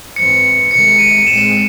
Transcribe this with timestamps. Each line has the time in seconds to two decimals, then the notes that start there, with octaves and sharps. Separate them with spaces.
0.16 G#2 E3 C4 C#7
0.71 C3 D#3 G#3 C#7
0.99 D#7
1.27 A2 G#3 C4 E7